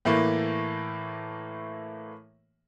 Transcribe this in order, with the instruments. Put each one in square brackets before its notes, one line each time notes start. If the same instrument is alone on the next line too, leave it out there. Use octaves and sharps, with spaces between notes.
[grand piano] A2 E3 A3 A#3